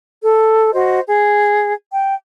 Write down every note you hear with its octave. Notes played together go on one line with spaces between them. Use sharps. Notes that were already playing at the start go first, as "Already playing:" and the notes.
A4
F#4 C5 D#5
G#4
G5